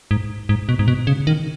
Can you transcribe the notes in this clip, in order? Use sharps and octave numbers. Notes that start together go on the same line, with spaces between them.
G#2
G#2
B2
G#2
B2
C#3
D#3